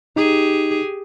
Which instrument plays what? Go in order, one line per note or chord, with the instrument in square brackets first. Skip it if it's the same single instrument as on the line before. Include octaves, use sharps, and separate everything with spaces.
[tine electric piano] D#4 [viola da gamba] G4 G#4